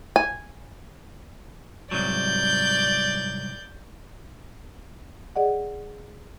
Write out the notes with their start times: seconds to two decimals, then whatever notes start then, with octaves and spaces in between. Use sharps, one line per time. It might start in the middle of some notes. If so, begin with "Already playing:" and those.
0.16 G#5
1.91 C2 G#2 F#3 D5 G6
5.36 G#4 D5 D#5 F#5